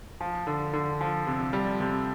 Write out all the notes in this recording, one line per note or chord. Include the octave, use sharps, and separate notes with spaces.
F3
D3
D3
F3
C3
G3
C3